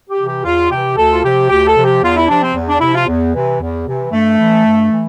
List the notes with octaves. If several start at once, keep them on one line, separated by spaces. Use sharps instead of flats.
G4
C3 E3
G4
E2 F4
C3 E3 G4
D2 A4
F4
C3 F3 G4
D2 G4
A4
C3 F3
G4
E2 F4
E4
C3 F3 D4
C4
E2
D4
C3 F3 E4
F4
E2
C3 E3
E2
C3 E3
G2 A3
E3
G2
E3